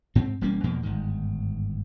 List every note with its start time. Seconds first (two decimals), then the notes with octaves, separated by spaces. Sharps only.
0.15 G#2 C4
0.41 E1 G3 A#3 C#4
0.64 E2 B2 F3 A#3
0.83 G1 G#2 D#3